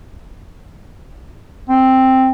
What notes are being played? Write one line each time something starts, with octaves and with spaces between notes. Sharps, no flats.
C4